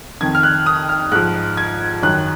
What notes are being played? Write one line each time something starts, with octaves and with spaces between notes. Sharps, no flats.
F2 D#3 G#6
F6
F#6
D#6
F6
G#2 F3 F#6
G#6
F#2 D#3 F#6